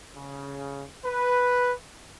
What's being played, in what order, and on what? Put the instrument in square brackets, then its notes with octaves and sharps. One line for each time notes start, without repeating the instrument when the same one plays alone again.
[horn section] C#3
B4